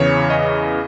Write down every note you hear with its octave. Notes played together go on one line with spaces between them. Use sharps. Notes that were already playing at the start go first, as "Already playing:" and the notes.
Already playing: E2 C#3 E3 C#5
D#5